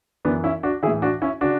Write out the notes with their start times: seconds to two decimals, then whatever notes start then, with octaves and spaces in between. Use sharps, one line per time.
0.25 F#2 E3 B3 D4
0.44 C#4 E4
0.63 D4 F#4
0.83 E3 E4 G#4
0.87 A2
1.02 D4 F#4
1.22 C#4 E4
1.41 C#3 D4 F#4